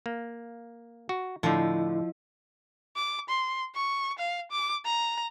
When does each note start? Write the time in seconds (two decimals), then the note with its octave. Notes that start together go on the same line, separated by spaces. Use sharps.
0.06 A#3
1.09 F#4
1.43 A2 D3 F3 E4 D#5
2.96 D6
3.29 C6
3.75 C#6
4.19 F5
4.51 D6
4.86 A#5